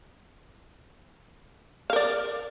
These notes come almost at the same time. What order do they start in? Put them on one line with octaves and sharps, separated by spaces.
F5 A#4 D5